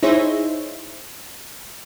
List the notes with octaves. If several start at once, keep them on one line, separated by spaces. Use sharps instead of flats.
D#4 E4 G#4 C5 C#5 E5